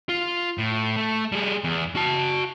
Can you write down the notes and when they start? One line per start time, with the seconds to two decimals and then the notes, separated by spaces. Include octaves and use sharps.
0.09 F4
0.58 A2
0.97 A3
1.32 G3 G#4
1.64 E2
1.96 F#4 A5